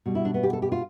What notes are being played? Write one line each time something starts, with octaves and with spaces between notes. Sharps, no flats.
B2 G3
E4
D4
B3
G4
A4
G4
F4